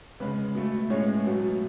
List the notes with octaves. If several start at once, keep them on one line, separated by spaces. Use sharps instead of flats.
C#3 G#3 B3 B4
B2 A3
A2 G#3 C#4 C#5
B2 F#3 A3